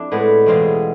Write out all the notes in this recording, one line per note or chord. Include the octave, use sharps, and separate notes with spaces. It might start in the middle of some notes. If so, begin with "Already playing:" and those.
Already playing: F2 D4 E4
A2 G#3 B3
E2 B2 G#3 C4 F4